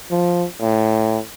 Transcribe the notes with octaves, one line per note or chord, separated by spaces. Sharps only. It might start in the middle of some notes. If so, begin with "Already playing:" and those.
F3
A2